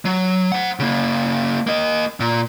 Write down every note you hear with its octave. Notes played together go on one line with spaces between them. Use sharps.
F#3
C5 F#5
C#3 A#3
A#3 D#5
A#2